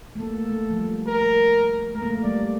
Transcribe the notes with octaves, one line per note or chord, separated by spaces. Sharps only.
A3
A#3 A4
A3
F3
G3
A#4
A3 A#4
A#3
A3
G3 D5